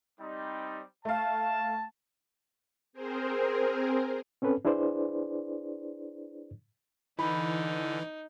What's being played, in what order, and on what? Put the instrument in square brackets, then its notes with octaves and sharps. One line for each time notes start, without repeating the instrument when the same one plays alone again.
[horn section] G3 C4 D#4
[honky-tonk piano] A3 F5 [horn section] A5
[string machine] C4 G#4 A#4 C5
[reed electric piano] C4 C#4 A4 B4
D4 E4 G#4 B4 C5 D5
[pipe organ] D3 [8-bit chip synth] E3 [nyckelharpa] D#4 [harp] B5